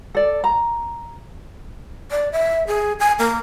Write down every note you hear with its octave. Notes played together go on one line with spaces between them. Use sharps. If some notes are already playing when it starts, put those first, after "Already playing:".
A4 D5
A#5
D5
E5
G#4
G#5
A#3